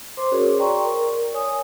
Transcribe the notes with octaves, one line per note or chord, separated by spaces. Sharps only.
C5 C6 D6
C#4 F#4 G#4 A#4 C#5
D5 G5 A#5 C6 C#6
A#4
C#5 G#5 D#6